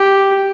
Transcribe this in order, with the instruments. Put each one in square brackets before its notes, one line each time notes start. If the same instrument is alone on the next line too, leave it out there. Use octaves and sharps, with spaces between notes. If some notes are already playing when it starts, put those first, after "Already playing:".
Already playing: [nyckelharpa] G4